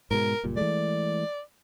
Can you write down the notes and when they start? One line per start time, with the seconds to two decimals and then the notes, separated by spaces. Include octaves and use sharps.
0.11 G#2 B2 G#3 A#4
0.44 F#1 A#2 G3
0.57 E3 G#3 A3 D5